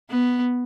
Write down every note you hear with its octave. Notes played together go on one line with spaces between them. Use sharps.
B3